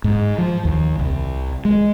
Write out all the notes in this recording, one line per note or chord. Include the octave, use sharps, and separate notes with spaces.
G#2
F3
D#2
C2
G#3